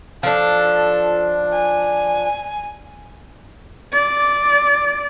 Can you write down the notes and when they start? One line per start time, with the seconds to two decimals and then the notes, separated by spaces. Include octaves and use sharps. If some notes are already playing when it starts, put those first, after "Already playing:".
0.23 F3 D4 A4
1.53 G#5
3.92 D5